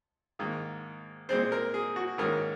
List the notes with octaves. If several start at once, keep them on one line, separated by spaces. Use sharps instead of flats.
G#2 D#3 A#3
A#2 G#3 C4 C5
A#4
G#4
F#4
G#2 D#3 A#3 C#4 A#4